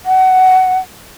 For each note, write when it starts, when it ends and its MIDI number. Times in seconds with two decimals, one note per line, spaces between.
0.06 0.78 78